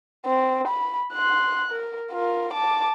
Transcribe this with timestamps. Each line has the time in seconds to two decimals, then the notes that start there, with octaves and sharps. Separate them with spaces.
0.26 C4
0.68 B5
1.13 C6 F#6
1.71 A#4
2.12 F4 A#4
2.53 A5 D6